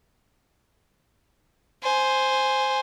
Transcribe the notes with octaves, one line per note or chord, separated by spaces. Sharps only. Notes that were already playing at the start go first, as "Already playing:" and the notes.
C5 G#5